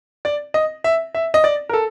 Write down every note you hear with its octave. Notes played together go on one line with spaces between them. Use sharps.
D5
D#5
E5
E5
D#5
D5
A#4
A4